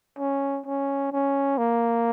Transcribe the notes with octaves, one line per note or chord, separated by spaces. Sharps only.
C#4
C#4
C#4
A#3